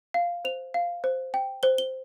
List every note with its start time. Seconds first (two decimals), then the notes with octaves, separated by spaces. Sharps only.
0.14 F5
0.45 C5 F7
0.74 F5
1.04 C5
1.34 G5
1.63 C5 G7
1.78 G7